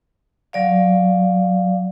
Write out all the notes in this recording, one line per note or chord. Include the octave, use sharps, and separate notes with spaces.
F#3 D5 F5